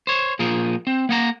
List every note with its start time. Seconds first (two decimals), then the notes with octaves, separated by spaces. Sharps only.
0.07 C5 C#5
0.39 A#2 F3 G#4 A#4
0.87 C4
1.09 A#3 F#5 A#5